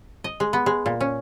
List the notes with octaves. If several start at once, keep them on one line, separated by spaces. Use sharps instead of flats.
D#5
G#3
B3
G#3
A#2
C#4